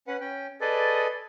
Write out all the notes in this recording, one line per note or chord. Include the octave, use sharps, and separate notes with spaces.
C#4 B4 F#5
C#4 G5
G#4 A4 B4 D5 D#5